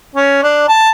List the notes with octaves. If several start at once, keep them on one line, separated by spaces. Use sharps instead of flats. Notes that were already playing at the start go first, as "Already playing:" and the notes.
C#4
D4
A5